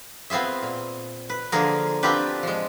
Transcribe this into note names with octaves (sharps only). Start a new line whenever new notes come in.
B3 C4 F4 G#4 E5
A#2
B4
D3 F3 A#3 G#4 A#4
B3 C4 D4 F4 G4 B4
F3 G#3